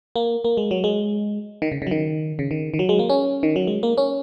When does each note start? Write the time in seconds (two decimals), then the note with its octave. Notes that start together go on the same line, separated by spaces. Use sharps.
0.16 A#3
0.44 A#3
0.57 G#3
0.71 F#3
0.84 G#3
1.62 D#3
1.72 C#3
1.82 C#3
1.87 F#3
1.91 D#3
2.39 C#3
2.51 D#3
2.74 D#3
2.79 F#3
2.89 G#3
2.99 A#3
3.10 C#4
3.43 D#3
3.56 F#3
3.67 G#3
3.83 A#3
3.98 C#4